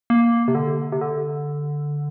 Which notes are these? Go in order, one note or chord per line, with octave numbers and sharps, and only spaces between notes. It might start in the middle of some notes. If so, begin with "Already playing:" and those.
A#3
C3
D3
C3
D3